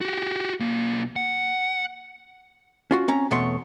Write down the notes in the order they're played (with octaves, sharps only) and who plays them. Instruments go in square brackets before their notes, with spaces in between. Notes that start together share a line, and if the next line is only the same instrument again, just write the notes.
[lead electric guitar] F#4 G4
B1 A#3
F#5
[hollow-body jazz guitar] C#4 F4 F#4
C4 C#4 A#5
E2 B2 A3 C#5 C6